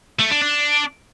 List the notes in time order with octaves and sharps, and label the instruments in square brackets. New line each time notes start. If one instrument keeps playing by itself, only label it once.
[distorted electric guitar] A3
D4
D4